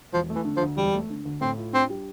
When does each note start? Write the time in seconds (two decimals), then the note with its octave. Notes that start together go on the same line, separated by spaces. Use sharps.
0.13 E1 F3
0.30 A3
0.35 E3
0.45 D3
0.57 F3
0.61 D2
0.77 E1 G3
0.94 A3
1.10 D3
1.25 D2
1.41 A2 C4
1.58 F4
1.73 C4 D4
1.90 G3